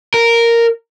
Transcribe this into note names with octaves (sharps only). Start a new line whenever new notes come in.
A#4